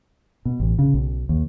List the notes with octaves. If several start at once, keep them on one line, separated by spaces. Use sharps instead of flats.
B2
A1
C#3
B1
D#2